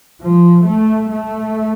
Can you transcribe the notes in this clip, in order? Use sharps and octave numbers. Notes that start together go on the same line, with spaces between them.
F3
A3
A3